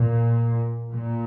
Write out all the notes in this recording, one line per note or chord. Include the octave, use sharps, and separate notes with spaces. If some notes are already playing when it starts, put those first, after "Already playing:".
Already playing: A#2
A#2